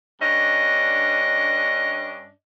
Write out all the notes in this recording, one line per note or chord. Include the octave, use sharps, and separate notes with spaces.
G2 C#4 D4 D#5